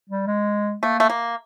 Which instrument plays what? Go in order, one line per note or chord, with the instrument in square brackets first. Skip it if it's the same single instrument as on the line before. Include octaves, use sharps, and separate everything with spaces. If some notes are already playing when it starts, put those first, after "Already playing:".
[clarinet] G3
G#3
[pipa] A3 [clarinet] A#3
[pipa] A3
A#3